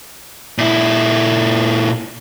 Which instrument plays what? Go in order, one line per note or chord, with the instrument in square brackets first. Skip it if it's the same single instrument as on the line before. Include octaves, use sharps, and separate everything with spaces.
[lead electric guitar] A#2 E4